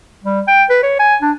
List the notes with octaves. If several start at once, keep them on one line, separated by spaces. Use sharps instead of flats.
G3
G5
B4
C#5
G#5
D4